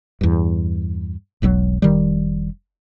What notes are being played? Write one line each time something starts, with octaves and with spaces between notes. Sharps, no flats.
E2 G2
E1 B1 C#3 F#3
F1 D#3 G3